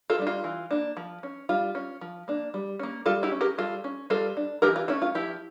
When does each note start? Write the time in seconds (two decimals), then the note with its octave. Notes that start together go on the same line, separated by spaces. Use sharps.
0.10 F4 A4
0.19 G3 D4
0.27 F4
0.44 E3
0.71 A#3 D4
0.97 F3
1.23 C#4
1.49 G3 F4
1.75 C#4
2.01 F3
2.28 A#3 D4
2.54 G3
2.79 A#3 C#4
3.06 G3 F4 A4
3.23 E4 G4
3.31 C#4
3.41 G4 A#4
3.58 G3 F4 A4
3.84 C#4
4.10 G3 F4 A4
4.37 D4
4.62 E3 G4 A#4
4.76 F4
4.88 A3 C#4 E4
5.02 F4
5.15 F3 E4 G4